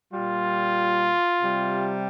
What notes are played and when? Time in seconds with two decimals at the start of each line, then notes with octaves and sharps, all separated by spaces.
0.12 A#2 G3 F4
1.41 C3 G3